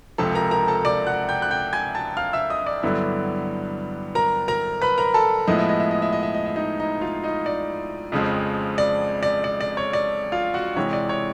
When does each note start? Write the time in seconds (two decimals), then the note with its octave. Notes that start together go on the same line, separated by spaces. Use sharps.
0.18 C#2 C3 F3 A4 A5
0.35 A#4 A#5
0.51 A#4 A#5
0.68 A4 A5
0.85 D5 D6
1.07 F#5 F#6
1.29 G5 G6
1.42 F#6
1.51 G5 G6
1.73 G#5 G#6
1.95 A5 A6
2.17 F5 F6
2.33 E5 E6
2.50 D#5 D#6
2.66 D5 D6
2.83 G2 D3 F#3 B3 E4
4.15 A#4 A#5
4.48 A#4 A#5
4.81 B4 B5
4.98 A#4 A#5
5.14 A4 A5
5.47 A2 F3 G#3 B3 E4 D#5
5.58 E5
5.69 D#5
5.80 E5
5.91 D#5
6.02 E5
6.13 D#5
6.23 E5
6.35 D#5
6.46 E5
6.56 D#4 D#5
6.80 D#4 D#5
7.01 F4 F5
7.24 D#4 D#5
7.46 D5
8.12 F2 C#3 F3 G#3 C4
8.78 D5
9.23 D5
9.44 D5
9.61 D5
9.77 C#5
9.93 D5
10.32 F4 F5
10.54 F#4 F#5
10.76 C3 E3 G#3 C#5
10.93 D5
11.09 C#5